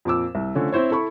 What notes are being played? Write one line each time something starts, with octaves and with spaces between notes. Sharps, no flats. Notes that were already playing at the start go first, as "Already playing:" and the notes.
F2 A#2 D6 E6
C2
D3 F3 A3 C#4
C4 E4 C5 C#5
E4 A4 B5 C#6